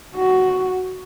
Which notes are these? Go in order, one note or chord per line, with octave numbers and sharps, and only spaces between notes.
F#4